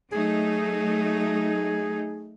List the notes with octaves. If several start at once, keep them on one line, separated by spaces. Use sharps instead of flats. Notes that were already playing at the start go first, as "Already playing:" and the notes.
F#3 A3 D#4 G#4